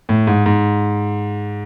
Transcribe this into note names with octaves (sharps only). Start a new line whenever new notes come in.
A2
G#2
G#2